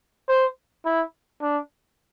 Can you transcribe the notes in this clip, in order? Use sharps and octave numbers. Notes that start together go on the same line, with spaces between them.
C5
E4
D4